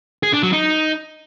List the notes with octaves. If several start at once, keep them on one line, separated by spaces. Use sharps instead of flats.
G#4
D4
F#3
D#4